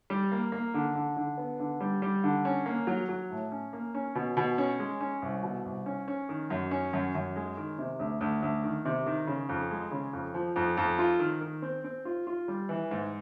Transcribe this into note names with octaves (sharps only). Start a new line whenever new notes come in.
G3
A#3
A#3
D3
D3
D3
B3
D3
G3
G3
D3
C#4
A#3
F#3
F#3
A2
C#4
A#3
C#4
B2
B2
C#4
G#3
C#4
C2
B2
C2
C#4
C#4
D#3
F#2
C#4
F#2
F#2
G#3
D#3
C3
D2
D2
D2
D#3
C3
D#3
C#3
F2
G#3
C#3
F2
F3
F2
F2
F4
D#3
D#3
C4
C4
F4
F4
G3
E3
G#2